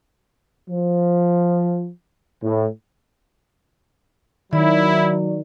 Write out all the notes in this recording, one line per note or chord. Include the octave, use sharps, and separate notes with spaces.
F3
A2
D#3 F#3 E4 D5